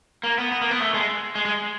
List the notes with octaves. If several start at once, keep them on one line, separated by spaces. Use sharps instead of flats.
A#3
B3
B3
A#3
B3
A3
G#3
G#3
G#3